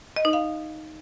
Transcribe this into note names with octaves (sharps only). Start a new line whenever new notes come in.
D#5
D#4
F5